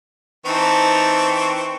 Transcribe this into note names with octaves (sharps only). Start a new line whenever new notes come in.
E3 C4 D#4 A5 C#6